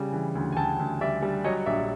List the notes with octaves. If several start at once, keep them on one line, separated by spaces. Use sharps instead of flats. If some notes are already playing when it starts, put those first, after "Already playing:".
Already playing: C#3 G3 G#5
E3
D2
G#5
D2 G5 A5
D2
G3 D5 E5
G3
F#3 C#5 D#5
A#1 D5 E5